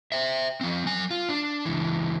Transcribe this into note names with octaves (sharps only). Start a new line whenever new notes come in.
C5 E5
F3 C4
F#3 G#5
F4
D4
C#2 E3